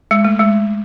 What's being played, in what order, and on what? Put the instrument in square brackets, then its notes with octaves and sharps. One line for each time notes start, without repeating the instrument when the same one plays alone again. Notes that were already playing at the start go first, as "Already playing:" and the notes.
[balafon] G#3
A3
G#3